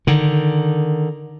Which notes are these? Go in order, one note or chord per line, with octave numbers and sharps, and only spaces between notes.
D3 D#3